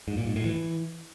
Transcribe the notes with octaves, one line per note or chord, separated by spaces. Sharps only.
G#2
A#2
G#2
A2
E3